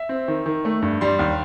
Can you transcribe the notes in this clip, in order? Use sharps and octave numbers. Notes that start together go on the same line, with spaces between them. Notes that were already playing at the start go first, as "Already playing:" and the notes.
Already playing: E5
C4
D#3
D#3
A3
G2
G3 C6
D#2